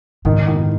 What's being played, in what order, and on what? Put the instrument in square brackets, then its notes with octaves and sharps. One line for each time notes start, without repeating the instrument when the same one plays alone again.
[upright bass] G#2 [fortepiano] D#3
[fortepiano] D#3